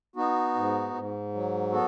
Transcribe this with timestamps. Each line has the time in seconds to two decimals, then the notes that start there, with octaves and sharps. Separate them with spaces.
0.16 B3 D#4 F#4
0.55 G#2
0.94 G#2
1.34 F#3
1.72 B3 F#4 A4